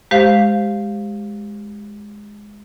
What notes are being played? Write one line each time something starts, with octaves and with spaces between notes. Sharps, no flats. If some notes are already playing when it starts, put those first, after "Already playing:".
G#3 G4 C5 F5